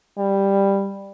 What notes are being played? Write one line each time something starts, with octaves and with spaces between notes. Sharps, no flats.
G3